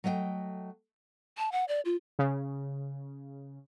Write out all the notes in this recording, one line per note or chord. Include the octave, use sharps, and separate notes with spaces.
F#3 A3 D#5 E5 G5
A5
F#5
D5
F4
C#3